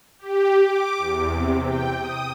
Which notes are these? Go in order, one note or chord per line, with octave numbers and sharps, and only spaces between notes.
G4
D6
E2
C3
G5
D#6